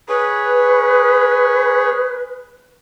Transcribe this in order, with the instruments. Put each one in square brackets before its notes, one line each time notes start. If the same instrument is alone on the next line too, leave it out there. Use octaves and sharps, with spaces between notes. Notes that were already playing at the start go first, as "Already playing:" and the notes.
[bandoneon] G#4 C#5 [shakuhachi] B4